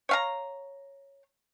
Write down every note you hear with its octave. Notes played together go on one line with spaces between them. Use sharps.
C#5 F5 A#5